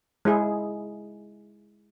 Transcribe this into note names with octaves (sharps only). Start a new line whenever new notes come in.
G#3 E4 G#4